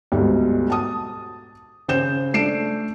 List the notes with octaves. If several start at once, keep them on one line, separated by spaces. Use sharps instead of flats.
D2 G#2 B2 G3
A5 D#6
C#3 C5 G6 E7
A3 D4 C7 D7 E7